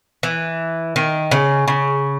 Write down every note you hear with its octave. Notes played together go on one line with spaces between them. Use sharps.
E3
D#3
C#3
C#3